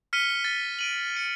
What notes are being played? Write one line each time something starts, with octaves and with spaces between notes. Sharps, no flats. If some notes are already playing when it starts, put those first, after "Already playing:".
F6 B6 C#7 D#7 G7
A6
D7 D#7 F#7
C#7